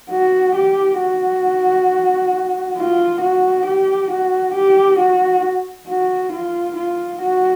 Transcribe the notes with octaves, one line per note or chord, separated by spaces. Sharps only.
F#4
G4
F#4
F4
F#4
G4
F#4
G4
F#4
F#4
F4
F4
F#4